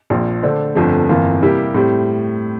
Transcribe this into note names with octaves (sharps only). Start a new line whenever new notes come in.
A#1 A#2 F3
D3 A3 D4 A4 C5
G1 F2 D3 F3 A3
G1 F2 E3 A#3 F4
C3 G3 A#3 E4 G4
A2 G3 C4